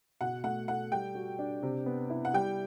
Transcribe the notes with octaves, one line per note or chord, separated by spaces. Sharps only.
B2 F#5
A3 F#5
A4 F#5
G3 G5
F#4
D4
C3
B3
E4
F#5
G3 G5